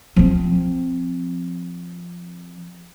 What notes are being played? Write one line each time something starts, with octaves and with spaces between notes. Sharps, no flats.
F3 C4